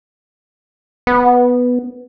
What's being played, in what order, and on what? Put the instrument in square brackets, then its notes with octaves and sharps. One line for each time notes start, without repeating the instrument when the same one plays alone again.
[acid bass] B3